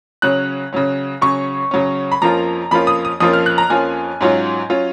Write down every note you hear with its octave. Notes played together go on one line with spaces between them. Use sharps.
C#3 F#3 C#4 F#6
C#3 F#3 C#4
C#3 F#3 C#4 C#6
C#3 F#3 C#4
B5
F2 F3 A#3 C#4 F4 A#5
F2 F3 A#3 C#4 F4 B5
D#6
D#6
F2 F3 A#3 C#4 F4 D#6
F6
F#6
A#5
F2 F3 A#3 C#4 F4 G#5
G#2 F#3 C#4 F4
F#3 C#4 F4